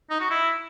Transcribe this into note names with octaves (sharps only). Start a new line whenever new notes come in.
D#4
F#4
E4